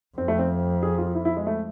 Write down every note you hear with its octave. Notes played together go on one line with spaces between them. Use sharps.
F2 C4
A3
C4
G#4
F4
E4
E4
G#3
A3